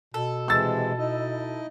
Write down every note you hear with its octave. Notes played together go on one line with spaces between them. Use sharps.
B2 A4
C3 E3 G#3 E6 A6
D#4 E4 D#5